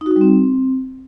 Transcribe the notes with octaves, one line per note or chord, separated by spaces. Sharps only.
D#4
F#4
D#4
G3
C4